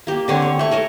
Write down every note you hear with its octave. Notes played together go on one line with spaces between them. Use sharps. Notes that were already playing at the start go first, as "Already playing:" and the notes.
A#3 G4
D3 C4 C#5
C#5
A3 C#6
A4 A#4 C#5